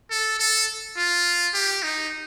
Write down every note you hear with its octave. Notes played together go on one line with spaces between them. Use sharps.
A4
A4
F4
G4
D#4